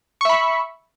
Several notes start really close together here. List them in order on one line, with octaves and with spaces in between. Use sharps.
C#6 E5 B5